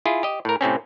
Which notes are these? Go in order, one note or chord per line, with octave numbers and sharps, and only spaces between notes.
E4 F4 G#4
G4 D#5
A2 A#4
A2 C3 C4 C#4